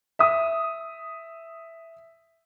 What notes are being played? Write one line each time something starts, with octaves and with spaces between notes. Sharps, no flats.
E5 D#6